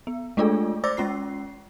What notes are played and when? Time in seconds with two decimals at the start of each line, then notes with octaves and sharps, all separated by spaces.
0.07 B3
0.37 G#3 A3 D4 F4 G#4 A4
0.84 C5 D5 D6 E6 A6 A#6
0.97 G#3 C#4 F4 C7